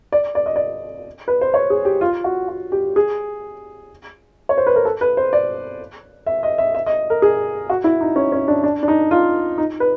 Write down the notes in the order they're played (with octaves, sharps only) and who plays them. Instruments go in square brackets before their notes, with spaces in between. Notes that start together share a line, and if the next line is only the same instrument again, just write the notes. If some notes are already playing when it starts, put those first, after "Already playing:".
[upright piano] D5
D5
D#5
D5
B4
C5
C#5
G#4
G4
F4
F#4
F#4
G4
G#4
C#5
C5
B4
A#4
A4
B4
C5
D5
E5
D#5
E5
E5
D#5
A#4
G#4
F#4
E4
D#4
C#4
C#4
D4
D4
D4
D#4
F4
D#4
B4